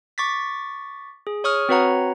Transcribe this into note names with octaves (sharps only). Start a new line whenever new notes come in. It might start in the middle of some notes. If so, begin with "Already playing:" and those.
C#6 D6 A6 B6
G#4
C#5 C#6 D#6 F6
C4 F#4 B4 C#5 F#5 A#5